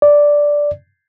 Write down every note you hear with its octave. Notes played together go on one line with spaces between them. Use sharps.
D5